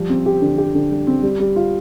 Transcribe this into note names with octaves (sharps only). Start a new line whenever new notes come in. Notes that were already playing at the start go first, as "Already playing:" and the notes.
Already playing: F3 G3
C4
G4
D3
G4
D3
G3
C4
G3
G3
F4